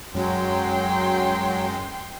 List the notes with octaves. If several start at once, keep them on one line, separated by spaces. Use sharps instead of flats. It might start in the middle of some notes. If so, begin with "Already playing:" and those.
F#2 F#3 G#3 G5 C6